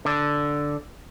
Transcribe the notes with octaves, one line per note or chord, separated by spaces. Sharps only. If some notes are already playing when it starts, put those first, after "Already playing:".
D3